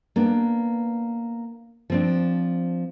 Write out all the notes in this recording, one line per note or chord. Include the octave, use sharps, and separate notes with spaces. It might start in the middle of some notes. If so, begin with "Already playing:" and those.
A#3 B3 D4
F3 C4 D4